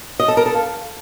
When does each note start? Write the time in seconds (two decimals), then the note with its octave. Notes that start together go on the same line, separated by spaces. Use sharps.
0.19 D#5
0.28 A4
0.37 A#4
0.46 A4
0.55 F5